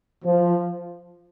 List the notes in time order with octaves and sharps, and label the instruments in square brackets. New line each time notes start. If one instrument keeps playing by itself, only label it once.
[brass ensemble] F3